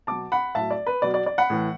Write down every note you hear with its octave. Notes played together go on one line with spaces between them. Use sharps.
B2 F#3 A5 D6
F#5 B5
A2 F#3 E5 A5
D5
B4
B2 F#3 D5
D5
D5
F#5 B5
A2 E3